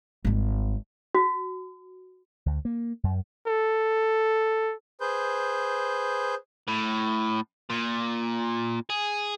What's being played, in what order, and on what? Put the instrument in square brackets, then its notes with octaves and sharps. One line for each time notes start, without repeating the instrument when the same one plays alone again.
[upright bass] G#1 G3
[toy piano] F#4
[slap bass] D2
A#3
F#2
[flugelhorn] A4
[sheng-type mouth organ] G#4 B4 C5 G6
[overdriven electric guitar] A2
A#2
G#4